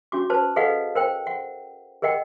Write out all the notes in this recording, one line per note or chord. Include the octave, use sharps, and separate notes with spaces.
C#4 F#4 D6
B4 C5 A5
G#4 A4 B4 D#5 F5 F#5
A#4 C5 G5
F#5
G#4 A#4 D#5 F#5 G5